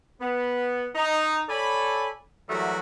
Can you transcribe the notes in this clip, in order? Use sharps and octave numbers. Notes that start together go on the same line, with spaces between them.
B3
D#4
A4 C#5 D5 G#5 B5
E3 F#3 G3 A3 F#4 A#4